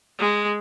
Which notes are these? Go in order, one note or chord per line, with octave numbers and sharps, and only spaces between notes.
G#3